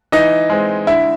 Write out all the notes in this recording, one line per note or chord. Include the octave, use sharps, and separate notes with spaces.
E3 D#4 D#5
G#3 C4
D3 E4 E5